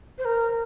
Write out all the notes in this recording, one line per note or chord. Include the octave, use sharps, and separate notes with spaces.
C5
A#4